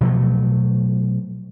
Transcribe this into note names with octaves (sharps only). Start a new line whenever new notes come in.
B2 F3 F#3 A3